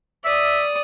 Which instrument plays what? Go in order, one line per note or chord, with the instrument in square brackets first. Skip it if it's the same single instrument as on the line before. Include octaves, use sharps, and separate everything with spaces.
[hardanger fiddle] D5 D#6 [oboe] E5